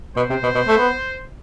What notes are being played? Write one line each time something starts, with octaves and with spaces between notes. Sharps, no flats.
B2 C5
C3
B2
B2
A3
B3